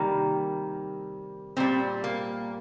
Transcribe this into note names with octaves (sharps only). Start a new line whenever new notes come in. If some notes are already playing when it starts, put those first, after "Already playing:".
Already playing: C3 D#3 G3 A#3
A#2 G3 C4
A#3